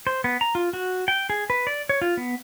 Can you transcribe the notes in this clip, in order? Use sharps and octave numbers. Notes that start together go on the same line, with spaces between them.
C5
B3
A#5
F4
F#4
G5
G#4
B4
D5
C#5
F4
B3